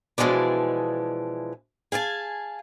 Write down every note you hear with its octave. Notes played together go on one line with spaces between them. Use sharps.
B2 E3 F3 G#3 D4
G#4 F5 G#5 A5